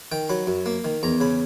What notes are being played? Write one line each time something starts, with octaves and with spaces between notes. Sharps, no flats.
D#3 G5
F#3 B5
F#2
A#3
D#3
E2 A#5
C#3 B5